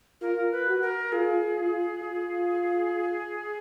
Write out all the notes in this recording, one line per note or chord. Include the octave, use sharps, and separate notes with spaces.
F4 A#4
B4
F#4
A#4
F4 G#4
F4
F4